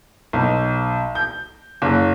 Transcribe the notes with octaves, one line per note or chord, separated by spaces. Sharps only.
B1
G6
F#1